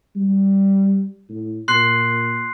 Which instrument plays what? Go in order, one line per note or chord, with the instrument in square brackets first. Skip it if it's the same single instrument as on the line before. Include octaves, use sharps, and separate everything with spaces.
[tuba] G3
A2
[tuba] A#2 [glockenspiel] C6 F#6 C7